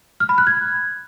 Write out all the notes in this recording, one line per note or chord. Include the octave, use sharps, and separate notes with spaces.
F6
B5
F#6
G#6